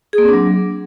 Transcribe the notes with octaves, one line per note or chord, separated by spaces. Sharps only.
G#4
A#3
C4
D4
F#3